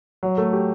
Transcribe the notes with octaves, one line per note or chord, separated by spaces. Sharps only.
F#3
A3
G4